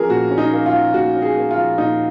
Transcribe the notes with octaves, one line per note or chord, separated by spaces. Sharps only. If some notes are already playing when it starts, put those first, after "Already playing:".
Already playing: F3 A#3 C#4 G#4 A#4
A#2 F#4
C#4
D#4
A#3
F4
F3
A#2 F#4
C#4
G#4
A#3
F4
F3
A#2 D#4